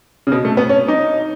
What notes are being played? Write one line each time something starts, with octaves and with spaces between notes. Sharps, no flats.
C#3
B2
A3
B3
C#4
D#4